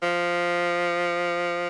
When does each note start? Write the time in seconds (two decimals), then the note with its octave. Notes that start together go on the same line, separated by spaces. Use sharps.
0.02 F3